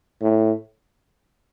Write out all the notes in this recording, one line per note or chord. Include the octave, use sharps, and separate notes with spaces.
A2